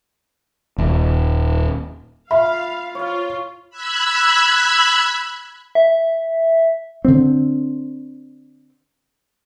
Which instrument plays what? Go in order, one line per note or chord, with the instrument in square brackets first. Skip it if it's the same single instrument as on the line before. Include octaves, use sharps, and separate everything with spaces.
[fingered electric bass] D#1
[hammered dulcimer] F4 [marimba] E5 [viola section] F5 [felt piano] B5
[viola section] F4 [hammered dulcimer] C#5 F5
[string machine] B5 E6 F#6 G#6
[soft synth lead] E5
[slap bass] D3 C4